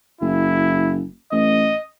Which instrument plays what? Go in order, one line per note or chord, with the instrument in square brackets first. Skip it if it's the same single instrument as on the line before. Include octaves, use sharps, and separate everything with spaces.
[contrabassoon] F#1 [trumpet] E4
[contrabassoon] A1 [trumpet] D#5